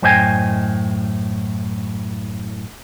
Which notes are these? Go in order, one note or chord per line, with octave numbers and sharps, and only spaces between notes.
F#2 A2 C5 D#5 G5 G#5